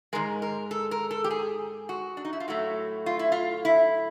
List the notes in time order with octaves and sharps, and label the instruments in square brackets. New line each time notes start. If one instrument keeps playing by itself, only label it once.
[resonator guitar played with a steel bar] G#2 D#3 G#3 A#4
A#4
A4
A#4
A4
G4
G#4
F#4
D4
D#4
E4
F4
A2 F#3 A3 F#4
F4
E4
F4
E4